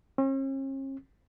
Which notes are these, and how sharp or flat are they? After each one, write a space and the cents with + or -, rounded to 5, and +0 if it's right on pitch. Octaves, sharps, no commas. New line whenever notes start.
C#4 -45